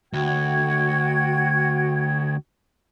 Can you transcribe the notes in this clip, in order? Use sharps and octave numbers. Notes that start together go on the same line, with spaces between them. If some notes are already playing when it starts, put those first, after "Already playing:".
D2 F#4 G5 G#6